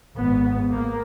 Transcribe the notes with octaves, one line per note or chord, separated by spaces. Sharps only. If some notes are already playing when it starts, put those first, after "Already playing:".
G#1 G#2 B3
A#3